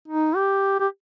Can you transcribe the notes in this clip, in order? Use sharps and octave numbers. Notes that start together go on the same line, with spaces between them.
D#4
G4
G4